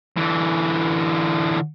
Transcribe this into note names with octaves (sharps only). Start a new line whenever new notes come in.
D3 E3